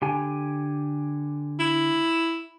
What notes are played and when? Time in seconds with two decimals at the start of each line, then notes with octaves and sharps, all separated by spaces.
0.02 D3 G4 G#5
1.59 E4